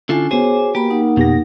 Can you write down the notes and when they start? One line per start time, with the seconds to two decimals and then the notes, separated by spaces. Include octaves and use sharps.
0.09 D3 C#4 D4 E4 F4 A4 G#5
0.31 B3 F#4 G#4 C5 C#5 G#5 D6
0.75 A#3 G4 A#5 B5
0.90 D#4 F#5
1.17 F2 B2 G4 A#6